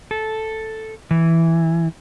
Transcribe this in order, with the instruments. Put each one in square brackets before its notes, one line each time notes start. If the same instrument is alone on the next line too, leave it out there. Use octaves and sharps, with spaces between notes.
[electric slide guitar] A4
E3